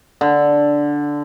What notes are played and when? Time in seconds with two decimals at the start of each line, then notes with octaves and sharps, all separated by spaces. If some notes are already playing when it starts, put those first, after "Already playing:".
0.21 D3